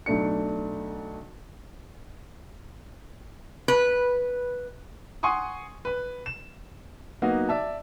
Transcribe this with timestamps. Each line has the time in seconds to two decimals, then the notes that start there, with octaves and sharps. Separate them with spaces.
0.06 B1 A3 D4 C#7
3.68 B4
5.23 F#5 G#5 C6 C#6 D#6
5.85 B4 B5
6.26 E7
7.22 F#3 A#3 B3 D#4 F#4
7.49 D5 E5 A5